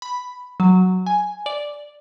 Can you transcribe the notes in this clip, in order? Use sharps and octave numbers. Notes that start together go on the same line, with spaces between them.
B5
F#3
G#5
D5